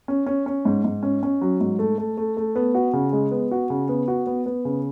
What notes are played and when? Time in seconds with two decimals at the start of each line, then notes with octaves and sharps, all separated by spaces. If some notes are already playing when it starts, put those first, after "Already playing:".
0.08 C#4
0.26 C#4
0.46 C#4
0.65 G#2
0.84 G#2
1.03 C#4
1.23 C#4
1.41 F#3
1.61 G#2
1.79 A3
1.98 A3
2.17 A3
2.37 A3
2.56 B3
2.74 F#4
2.93 C#3
3.13 G#3
3.31 B3
3.51 F#4
3.70 C#3
3.89 B3
4.08 F#4
4.27 B3
4.46 B3
4.65 C#3